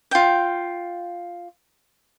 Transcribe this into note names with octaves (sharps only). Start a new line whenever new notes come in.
F4 G5